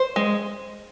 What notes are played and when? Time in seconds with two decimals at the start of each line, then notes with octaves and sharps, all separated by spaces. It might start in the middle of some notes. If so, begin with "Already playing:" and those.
Already playing: C5
0.16 G#3